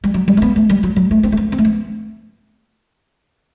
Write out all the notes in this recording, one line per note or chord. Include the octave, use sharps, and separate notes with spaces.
G3
F#3
G3
A3
B3
A3
G3
F#3
F#3
A3
C4
A3
B3
C4
A3
B3